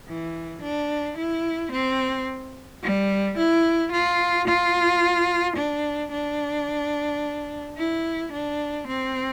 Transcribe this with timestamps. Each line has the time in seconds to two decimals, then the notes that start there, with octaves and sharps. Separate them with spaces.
0.08 E3
0.62 D4
1.18 E4
1.72 C4
2.83 G3
3.38 E4
3.92 F4
4.48 F4
5.57 D4
6.12 D4
7.78 E4
8.33 D4
8.88 C4